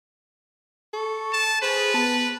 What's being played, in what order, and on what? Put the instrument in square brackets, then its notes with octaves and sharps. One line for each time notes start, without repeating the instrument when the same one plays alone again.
[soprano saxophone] A4 [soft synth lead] C#6
[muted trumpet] A5
[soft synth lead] G#4 [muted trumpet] B4 [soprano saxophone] C5
[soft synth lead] B3 [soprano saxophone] A5